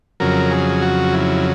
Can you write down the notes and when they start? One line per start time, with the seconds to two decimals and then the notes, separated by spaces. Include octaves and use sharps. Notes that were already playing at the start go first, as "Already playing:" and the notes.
0.20 F2 C#3 F#3 A#4
0.51 G#4
0.82 F#4
1.14 E4